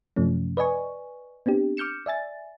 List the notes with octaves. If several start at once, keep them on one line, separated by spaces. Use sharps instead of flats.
F#2 C3 F3 A3 C#4
B4 D5 D#5 G#5 C#6
B3 C4 D4 G4
D6 F6 G6 C#7 E7
D5 E5 G#5 A6